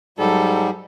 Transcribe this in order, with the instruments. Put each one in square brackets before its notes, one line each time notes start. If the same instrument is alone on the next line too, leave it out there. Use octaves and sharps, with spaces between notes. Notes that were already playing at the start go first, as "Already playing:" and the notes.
[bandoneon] G#2 G3 [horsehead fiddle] F#3 A4